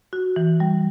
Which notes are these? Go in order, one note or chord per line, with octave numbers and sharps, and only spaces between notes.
F#4
E3
G3